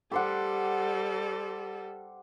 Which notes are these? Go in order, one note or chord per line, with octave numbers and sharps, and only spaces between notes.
G3 G4 A4 C5 F#5